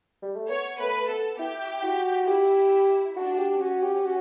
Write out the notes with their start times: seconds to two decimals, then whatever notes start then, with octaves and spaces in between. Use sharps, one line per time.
0.22 G3
0.36 A3
0.50 B3 C#5
0.80 A3 B4
1.09 B3 A4
1.39 E4 G4
1.83 F#4
2.27 E4 G4
3.17 D4 F#4
3.34 F#4
3.38 G4
3.60 C#4 F#4
3.83 G4
4.05 F#4